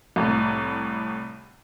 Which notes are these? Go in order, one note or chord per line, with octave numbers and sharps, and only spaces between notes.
C2 A2